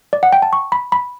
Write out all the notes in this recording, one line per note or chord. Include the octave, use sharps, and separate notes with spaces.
D5
F#5
G5
A5
C#6
B5
B5